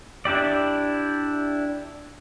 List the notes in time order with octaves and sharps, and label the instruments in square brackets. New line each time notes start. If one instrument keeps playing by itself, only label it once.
[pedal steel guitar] D4 E4 G4 D5